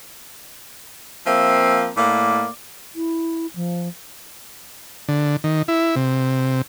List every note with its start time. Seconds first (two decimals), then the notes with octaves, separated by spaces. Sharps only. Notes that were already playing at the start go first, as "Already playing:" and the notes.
1.27 F3 A#3 C4 E5
1.97 A2 A#3 D5
2.95 E4
3.56 F3
5.08 D3
5.44 D#3
5.68 E4
5.96 C3